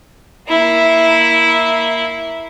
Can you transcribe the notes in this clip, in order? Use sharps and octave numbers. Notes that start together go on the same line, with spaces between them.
A#3 E4